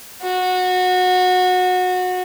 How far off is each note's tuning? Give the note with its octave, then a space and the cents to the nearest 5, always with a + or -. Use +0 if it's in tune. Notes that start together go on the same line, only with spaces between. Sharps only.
F#4 -20